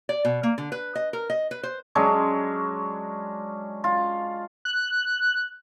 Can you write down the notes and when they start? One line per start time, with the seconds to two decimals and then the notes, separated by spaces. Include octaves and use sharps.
0.09 D5
0.25 B2
0.43 A#3
0.58 D3
0.72 B4
0.95 D#5
1.13 A#4
1.30 D#5
1.51 B4
1.63 C5
1.95 F#3 G#3 C#4 D4
3.84 F4
4.65 F#6